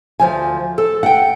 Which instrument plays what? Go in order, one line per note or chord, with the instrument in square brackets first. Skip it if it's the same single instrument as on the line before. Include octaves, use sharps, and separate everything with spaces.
[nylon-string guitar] D2 F3 G#5
A4
F#5 G5